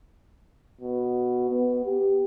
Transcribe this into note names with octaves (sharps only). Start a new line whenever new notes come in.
B2
B3
G4